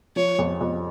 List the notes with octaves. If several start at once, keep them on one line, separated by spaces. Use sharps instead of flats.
F3 C#5
F2
F2